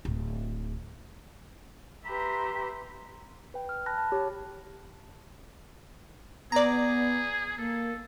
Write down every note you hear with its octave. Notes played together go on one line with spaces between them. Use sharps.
D1
G4 B4 E5 A#5 C6
B4 G5
F6
A5 B5 F#6 A#6
A5
G4 C#5
B3 G#4 D5 A#5
A#3 A4